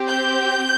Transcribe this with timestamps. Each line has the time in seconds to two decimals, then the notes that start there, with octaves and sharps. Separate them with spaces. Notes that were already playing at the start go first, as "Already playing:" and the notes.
Already playing: C4 G4
0.09 G6